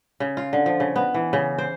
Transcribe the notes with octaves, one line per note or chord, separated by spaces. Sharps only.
C#3
F4
D3
F3
C#3
B3
E3
C#3
C5